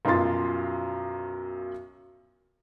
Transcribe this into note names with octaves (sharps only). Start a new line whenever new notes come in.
B1 F#2 F3 F4 C6 A6